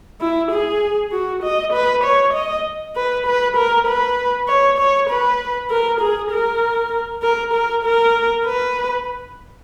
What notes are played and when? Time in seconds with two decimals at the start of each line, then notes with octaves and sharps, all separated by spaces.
0.21 E4
0.51 G#4
1.11 F#4
1.43 D#5
1.73 B4
2.04 C#5
2.34 D#5
2.96 B4
3.26 B4
3.57 A#4
3.87 B4
4.48 C#5
4.78 C#5
5.10 B4
5.70 A#4
6.00 G#4
6.31 A#4
7.22 A#4
7.53 A#4
7.84 A#4
8.45 B4